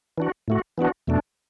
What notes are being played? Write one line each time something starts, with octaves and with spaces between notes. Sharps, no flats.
E3 D4 F#4
A2 A3 F#4
E3 B3 D4 F#4
E2 B2 A3 D4